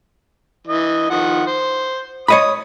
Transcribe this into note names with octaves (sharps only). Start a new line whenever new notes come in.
E3 D#5
D#3 F3 F#5
C5
C#5 D#5 B5 D#6